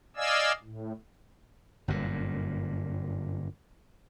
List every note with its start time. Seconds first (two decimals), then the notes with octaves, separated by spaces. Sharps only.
0.17 D5 D#5 F5 G#5 E6
0.64 A2
1.88 G1 F#2 A#2